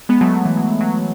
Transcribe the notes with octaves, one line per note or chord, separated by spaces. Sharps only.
G#3 B3
F#3 A3
F#3
E3
F#3
F#3